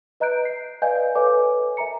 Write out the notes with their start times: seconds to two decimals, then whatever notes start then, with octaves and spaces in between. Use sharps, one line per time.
0.20 B4 D#5 A#5 F#6 G6 D7
0.45 C7
0.82 B4 D5 D#5 F5 G#5 G6
1.15 A4 B4 C#5 D#5 G#5 D6
1.77 A#4 E5 G#5 A#5 C#7